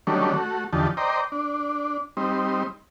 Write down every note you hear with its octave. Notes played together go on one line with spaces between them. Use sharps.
D#3 F#3 G3 A3 C#4 D4
A3 F#4
E2 D3 F3 D#4 G4 A5
C5 D5 D#5 G5 A#5
D4
G3 C4 D#4